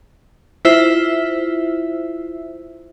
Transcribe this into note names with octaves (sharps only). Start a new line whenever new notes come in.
E4 F4 C5 E5 E6